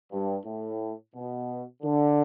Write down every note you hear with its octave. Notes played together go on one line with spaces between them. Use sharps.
G2
A2
B2
D3